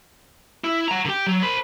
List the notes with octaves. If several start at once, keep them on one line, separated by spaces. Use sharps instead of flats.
E4
F#5 A#5
D3 G4
F#3
C5 B5